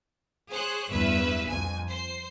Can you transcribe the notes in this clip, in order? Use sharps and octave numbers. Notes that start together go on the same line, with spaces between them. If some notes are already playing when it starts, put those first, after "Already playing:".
G#4 C5 C#5 F#6
E2 G2 B4 E5 E6
F2 G#5
C5 C7